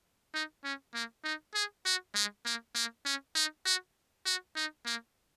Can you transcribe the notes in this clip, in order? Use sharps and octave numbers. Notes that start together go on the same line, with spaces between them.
D#4
C#4
A#3
D#4
G#4
F#4
G#3
A#3
A#3
C#4
D#4
F#4
F#4
D#4
A#3